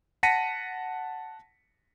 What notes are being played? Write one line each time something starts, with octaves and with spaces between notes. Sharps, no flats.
F#5 A5 A#6 B6 C#7 D#7